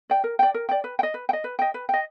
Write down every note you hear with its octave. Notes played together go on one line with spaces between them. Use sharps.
D5 G5
A#4
D5 G5
A#4
D5 G5
B4
G5
D#5
B4
G5
D#5
B4
D#5 G5
B4
D#5 G5